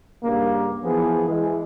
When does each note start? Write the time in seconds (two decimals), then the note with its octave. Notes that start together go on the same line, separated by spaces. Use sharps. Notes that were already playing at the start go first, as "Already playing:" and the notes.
0.23 G2 C#3 A#3
0.83 E3 F3 B3 G#4
1.27 E3 G#3